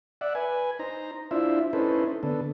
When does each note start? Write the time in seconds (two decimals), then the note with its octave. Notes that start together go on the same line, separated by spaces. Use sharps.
0.21 D5 E5 F#5
0.35 B4 G#5
0.79 D#4 C5 A#5
1.31 D4 E4 F4 C5 E5
1.73 C#4 D#4 E4 A4 B4 C5
2.23 D3 B3 A4